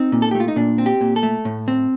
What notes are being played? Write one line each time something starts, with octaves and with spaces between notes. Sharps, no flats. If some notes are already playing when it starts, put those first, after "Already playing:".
Already playing: C4 D#4
A#2
A4
A3 G4
F4
D#4
A#2 D4
C4
G4
A#2
A4
A3
A2
C4